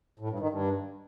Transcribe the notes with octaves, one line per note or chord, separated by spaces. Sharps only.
A2
G2
D#3
G2